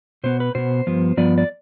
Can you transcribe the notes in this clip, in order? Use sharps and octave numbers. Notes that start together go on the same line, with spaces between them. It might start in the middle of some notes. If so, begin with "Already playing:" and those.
B2 B3 C5
B4
B2 B3 C5
G2 F3 B3
G2 F3 B3 D5
D5